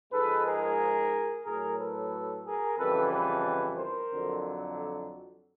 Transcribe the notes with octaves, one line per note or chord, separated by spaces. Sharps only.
G#2 F3 G#3 A4 B4
G#4 A#4
A2 F#3 G#4 A#4
A4 B4
G#4 A#4
F2 C#3 E3 G3 A4 B4
A4 B4
A#4 C5
F2 D3 F#3